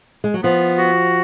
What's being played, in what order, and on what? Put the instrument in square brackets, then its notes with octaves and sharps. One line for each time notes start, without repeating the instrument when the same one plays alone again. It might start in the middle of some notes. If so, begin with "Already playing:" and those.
[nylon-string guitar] G#3
F#3
[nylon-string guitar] F3 [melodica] B3
[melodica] F#4